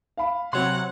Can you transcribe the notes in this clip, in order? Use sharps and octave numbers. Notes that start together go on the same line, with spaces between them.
F5 B5
C3 F#3 C4 C#5 F#5 C6